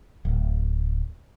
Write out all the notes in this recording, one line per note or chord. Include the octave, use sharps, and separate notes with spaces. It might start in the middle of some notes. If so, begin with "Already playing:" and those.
D1